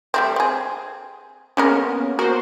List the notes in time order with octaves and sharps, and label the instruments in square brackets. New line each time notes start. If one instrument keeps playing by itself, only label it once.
[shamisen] G3 A3 C4
C4 G#4
[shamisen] D3 G#3 A#4 [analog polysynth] A#3 B3 C#4
[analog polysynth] F#4 C5 [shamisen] A#4